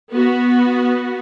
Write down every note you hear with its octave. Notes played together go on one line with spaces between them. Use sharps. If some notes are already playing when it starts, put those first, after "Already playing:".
B3 F#4